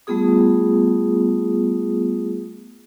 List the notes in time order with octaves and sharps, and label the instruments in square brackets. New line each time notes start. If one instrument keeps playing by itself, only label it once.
[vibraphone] G3 A3 B3 F4 G#4 D#6